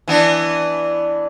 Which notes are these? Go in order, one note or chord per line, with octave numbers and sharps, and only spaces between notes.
E3 B3 D4